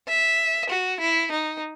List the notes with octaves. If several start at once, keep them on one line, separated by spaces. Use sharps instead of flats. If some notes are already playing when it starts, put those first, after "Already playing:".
E5
F#4
E4
D#4